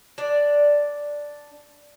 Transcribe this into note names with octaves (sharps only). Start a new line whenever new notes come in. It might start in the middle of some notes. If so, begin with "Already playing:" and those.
D4 D5